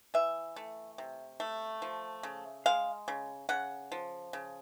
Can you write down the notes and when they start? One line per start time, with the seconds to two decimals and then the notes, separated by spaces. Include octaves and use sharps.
0.14 E3 E5
0.56 A3
0.98 C3
1.40 A3
1.82 F3
2.23 C#3
2.66 G#3 F5
3.08 C#3
3.49 C#3 F#5
3.92 F3
4.33 C#3